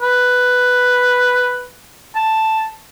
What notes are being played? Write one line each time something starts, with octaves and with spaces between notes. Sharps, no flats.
B4
A5